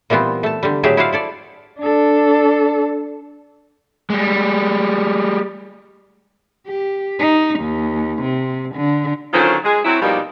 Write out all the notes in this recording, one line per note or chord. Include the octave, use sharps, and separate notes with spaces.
A#2 E3 G3 B3 C4
A3 A5
D3 G3
A2 F#3 G4 G#4 E5
E4 F#4 G#4 C5 D5 F5
E4 A4 D5
D4 A4
G3 G#3
G4
D#4
D#2
C3
D3
D3 D#3 F#3 C#4 F4 C5
G#3 G#4
F#3 C4 E4
B2 F3 G3 A#3 D#4 G4